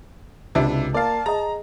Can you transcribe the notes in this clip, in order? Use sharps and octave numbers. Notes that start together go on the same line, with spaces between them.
C#2 C3 D4 E4
A#3 D5 F5 A5
G#4 D#5 A#5